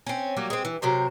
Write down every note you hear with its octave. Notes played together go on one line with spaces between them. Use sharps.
C4 C#4
F#3 G3 A#3
G#3 C4
E3
C3 F#3 A#4 C5